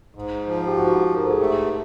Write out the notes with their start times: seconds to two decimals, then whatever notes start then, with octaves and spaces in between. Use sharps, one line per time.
0.15 G#2
0.47 F3
0.67 G4
0.77 G#2 F#4
1.09 G#2
1.15 A#4
1.23 A4
1.31 G#4
1.39 A3 G4